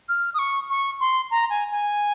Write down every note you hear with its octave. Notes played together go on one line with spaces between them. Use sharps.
F6
D#6
C#6
C#6
C6
A#5
G#5
G#5